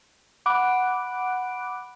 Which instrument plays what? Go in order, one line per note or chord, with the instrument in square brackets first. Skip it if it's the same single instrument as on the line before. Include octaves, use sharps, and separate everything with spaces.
[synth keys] F#5 B5 D6 F#6 D7